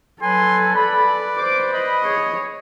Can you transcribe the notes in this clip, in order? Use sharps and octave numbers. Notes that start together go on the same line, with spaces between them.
F#3 A4 B4 G#5 C6
B4 D5 B5
C5 D6
D#5 B5
G#4 C#5